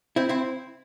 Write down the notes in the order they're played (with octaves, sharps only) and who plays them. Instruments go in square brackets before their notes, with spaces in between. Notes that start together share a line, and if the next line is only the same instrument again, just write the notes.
[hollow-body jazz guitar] C4 E4
C4 E4